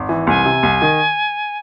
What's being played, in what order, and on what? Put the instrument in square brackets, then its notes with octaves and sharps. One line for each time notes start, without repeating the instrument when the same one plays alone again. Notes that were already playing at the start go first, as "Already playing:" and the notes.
Already playing: [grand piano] G#1
E3
[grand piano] C2 [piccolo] G#5
[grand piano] C3
C2
D#3